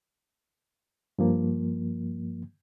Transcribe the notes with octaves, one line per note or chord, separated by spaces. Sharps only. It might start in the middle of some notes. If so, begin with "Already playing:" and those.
G2 F3 A#3